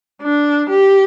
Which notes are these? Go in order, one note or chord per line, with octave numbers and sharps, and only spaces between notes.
D4
G4